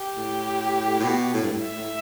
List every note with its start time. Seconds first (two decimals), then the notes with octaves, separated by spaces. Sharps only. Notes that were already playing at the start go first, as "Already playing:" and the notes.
Already playing: G4
0.17 A2
0.99 A2
1.04 B2
1.34 A2
1.44 G2
1.52 A2
1.63 E5
1.77 A2